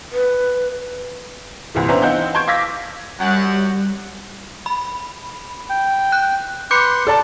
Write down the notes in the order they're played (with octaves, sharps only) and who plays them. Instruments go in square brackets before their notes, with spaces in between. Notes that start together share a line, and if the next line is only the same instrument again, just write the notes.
[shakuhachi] B4
[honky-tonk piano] C2 A#2 E3
B3 C#4 D4 C5 E5 A#5
E3 C4 D#4 F5 F#5 G6
A5 C6 C#6 G6 G#6 D7
F5 D6 E6 G#6 A#6 B6
[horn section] F#2 F#5 [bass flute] G3
[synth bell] B5
[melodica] G5
[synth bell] F#6
[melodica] B4 C6 [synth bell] D6 G6 C#7
[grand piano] A4 D5 A5